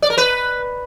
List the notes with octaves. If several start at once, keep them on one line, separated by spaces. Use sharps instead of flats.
D5
A#4
B4